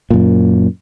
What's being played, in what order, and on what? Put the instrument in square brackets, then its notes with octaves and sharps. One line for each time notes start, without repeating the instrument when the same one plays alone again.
[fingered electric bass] F#2 A#2